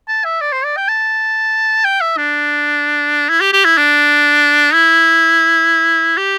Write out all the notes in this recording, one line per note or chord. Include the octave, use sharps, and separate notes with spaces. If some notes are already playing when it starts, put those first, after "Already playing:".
A5
E5
D5
C5
D5
G5
A5
G5
E5
D4
E4
G4
G4
E4
D4
E4
G4